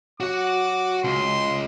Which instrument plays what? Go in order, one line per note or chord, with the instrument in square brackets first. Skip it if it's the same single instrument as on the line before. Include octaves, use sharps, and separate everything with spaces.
[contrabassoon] F#3 [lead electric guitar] F#4 F#5 [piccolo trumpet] D6
[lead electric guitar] C#2 [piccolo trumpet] C6